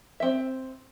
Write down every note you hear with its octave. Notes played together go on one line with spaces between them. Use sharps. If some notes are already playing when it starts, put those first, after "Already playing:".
C4 E5